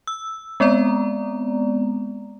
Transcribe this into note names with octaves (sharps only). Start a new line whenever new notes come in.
E6
G#3 B3 C4 D5 A#5